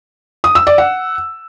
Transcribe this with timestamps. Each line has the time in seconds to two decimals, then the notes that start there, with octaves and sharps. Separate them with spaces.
0.44 D#6
0.55 E6
0.67 D5
0.78 F#5